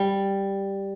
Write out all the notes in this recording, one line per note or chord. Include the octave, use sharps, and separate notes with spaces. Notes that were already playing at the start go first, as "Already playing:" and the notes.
Already playing: G3